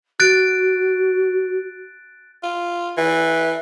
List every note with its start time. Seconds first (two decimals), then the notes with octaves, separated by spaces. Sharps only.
0.20 F#4 F#6 A6 D7
2.43 F4
2.97 E3